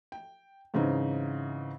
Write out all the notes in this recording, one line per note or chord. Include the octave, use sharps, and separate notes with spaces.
G5
G#2 C#3 E3 C4 D#4